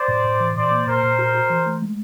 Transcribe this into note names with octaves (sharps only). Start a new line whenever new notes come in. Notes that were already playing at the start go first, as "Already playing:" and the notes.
Already playing: C5 D5
A2
A2
E3
A#2 C5 D5
A#3
A#2 A#4 C5
A#2
F#4
F#4
E3
A3
G#3